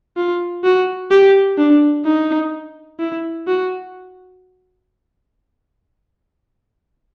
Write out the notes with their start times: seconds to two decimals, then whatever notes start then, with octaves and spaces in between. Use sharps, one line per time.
0.17 F4
0.64 F#4
1.11 G4
1.58 D4
2.05 D#4
3.00 E4
3.47 F#4